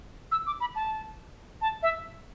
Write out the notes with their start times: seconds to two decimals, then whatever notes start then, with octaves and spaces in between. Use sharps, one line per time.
0.31 E6
0.46 D6
0.60 B5
0.75 A5
1.61 A5
1.82 E5